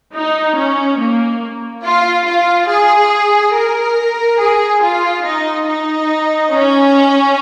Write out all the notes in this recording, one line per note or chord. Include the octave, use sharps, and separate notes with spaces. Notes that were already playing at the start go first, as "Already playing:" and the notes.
D#4
C#4
A#3
F4
F4
G#4
A#4
G#4
F4
D#4
D#4
C#4